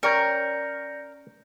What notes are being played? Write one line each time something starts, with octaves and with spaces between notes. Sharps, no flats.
C#4 A#4 D5 G5 A#5 G6 A#6 C#7